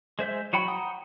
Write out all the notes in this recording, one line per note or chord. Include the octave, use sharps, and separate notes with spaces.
G#3 C5 E5 G6
F#3 F#4 G5 B5
F#5 G5 A#5 D#6